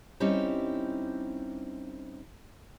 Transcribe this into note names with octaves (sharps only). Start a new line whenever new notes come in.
G3 C4 C#4 D#4 E4 G4